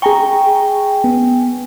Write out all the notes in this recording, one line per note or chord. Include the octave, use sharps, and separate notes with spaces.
G#4 G5 G#5 A#5 C#6
B3